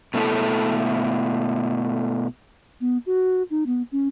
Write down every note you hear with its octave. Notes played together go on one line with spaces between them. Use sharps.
B2 A3 C4 E4 A4
B3
F#4
D#4
B3
C#4